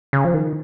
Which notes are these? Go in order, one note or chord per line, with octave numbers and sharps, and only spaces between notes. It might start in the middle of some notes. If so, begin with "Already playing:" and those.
C#3
F3
D#3